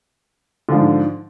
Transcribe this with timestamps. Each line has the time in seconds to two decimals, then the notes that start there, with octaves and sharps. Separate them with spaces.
0.69 D3
0.71 F3
0.74 G#2